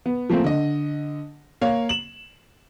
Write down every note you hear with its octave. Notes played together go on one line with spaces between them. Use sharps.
B3
F3 A3 A#3 C4
D3 D#5
A#3 C#5 F5
E7 F#7